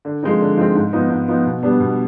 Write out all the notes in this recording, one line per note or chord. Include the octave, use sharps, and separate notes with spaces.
D3
F3 G#3 C4 D#4
D3
F3 G#3 C4 D#4
G#2
F3 B3 D#4
G#2
F3 B3 D#4
B2
G3 B3 D4
B2